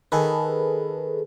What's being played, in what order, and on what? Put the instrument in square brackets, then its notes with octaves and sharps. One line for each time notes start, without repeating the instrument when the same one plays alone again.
[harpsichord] D#3 [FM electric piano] G#4 A4 B4